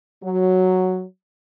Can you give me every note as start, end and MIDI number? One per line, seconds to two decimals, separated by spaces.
0.23 1.03 54